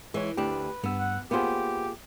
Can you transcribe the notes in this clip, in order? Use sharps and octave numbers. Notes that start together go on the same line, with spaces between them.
E3 G#3 C#5
D2 D4 G4 B4
G2 B3 E6
F#5
A#3 B3 F4 G4 G#4 C5